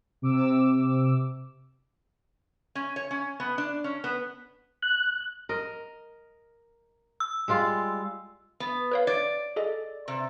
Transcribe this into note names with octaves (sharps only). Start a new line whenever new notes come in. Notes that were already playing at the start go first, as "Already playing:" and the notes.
C3 D6 E6
C#4
C#5
C#4
B3
D4
C#4
B3
F#6
A#4 D#5
E6
G3 G#3 F4
B3
B4 C#5 F5
C#5 D5
G#4 A4 D#5
C3